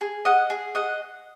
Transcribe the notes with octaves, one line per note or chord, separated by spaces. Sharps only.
G#4
D#5 F#5
G#4
D#5 F#5